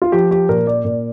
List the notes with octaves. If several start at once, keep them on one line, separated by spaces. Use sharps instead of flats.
F4
F3 G4
G4
A#2 A#4
D5
A#2